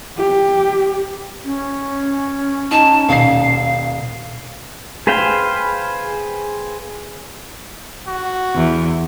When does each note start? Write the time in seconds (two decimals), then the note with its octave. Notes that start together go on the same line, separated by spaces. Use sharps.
0.17 G4
1.45 C#4
2.71 D#4 A5
3.09 D#1 B2 F5 C7
5.07 G#4 B4 C5 F5 G5
8.08 F#4
8.55 E2